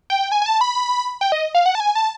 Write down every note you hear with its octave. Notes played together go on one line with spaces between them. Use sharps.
G5
G#5
G#5
A5
B5
G5
D#5
F5
F#5
A5
G#5
A5